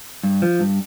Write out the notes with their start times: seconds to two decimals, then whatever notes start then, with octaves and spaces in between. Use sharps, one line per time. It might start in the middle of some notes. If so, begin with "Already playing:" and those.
0.24 G2
0.42 F3
0.60 G2